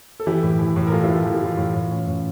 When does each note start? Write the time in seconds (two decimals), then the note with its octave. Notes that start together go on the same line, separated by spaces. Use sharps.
0.20 A4
0.27 E3 E4 G4
0.43 A2
0.59 E3
0.76 A2
0.87 A#4
0.92 E3 F4 A4
1.04 E4 G4
1.09 A2 F4
1.24 E3 F4
1.34 G4
1.42 E3 F4
1.58 A2
1.75 A2
1.90 C#4
2.07 A2